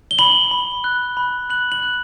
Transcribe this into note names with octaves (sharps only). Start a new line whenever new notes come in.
G7
B5 F#7
B5
F#6
B5
F#6 F#7
F#7
F#6